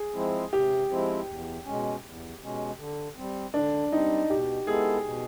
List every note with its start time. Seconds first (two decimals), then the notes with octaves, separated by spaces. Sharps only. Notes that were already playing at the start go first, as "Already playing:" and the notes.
Already playing: G#4
0.15 F3 G#3 C4 E4
0.53 C3 G4
0.90 F3 G#3 C4 E4
1.28 E2
1.65 B2 G#3 C#4
2.04 E2
2.42 B2 G#3 C#4
2.78 D3
3.17 G3 C4
3.54 D3 D4
3.92 G3 C4 D#4
4.29 B2 G4
4.67 G#3 B3 E4 G#4 A4
5.05 B2